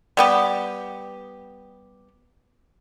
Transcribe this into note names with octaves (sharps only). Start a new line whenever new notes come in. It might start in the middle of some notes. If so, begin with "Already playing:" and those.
G3 B3 G4